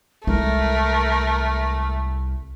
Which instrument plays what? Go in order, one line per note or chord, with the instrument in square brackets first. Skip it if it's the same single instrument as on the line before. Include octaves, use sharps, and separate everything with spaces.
[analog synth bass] C2 [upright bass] G#3 E4 [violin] A3 [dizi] A#4